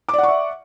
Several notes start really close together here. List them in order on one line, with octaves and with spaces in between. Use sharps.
D6 D5 F#5 C#6 E5